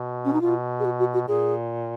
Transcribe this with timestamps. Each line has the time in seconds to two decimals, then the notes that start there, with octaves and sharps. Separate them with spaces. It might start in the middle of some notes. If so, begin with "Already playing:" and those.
Already playing: B2
0.25 C#4
0.33 D#4
0.41 B2 F4
0.80 G#4
0.85 F#4
0.99 F#4
1.14 F#4
1.28 A#2 G#4